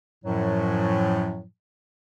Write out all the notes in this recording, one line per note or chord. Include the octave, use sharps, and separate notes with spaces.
F#2 A2 F3 F#3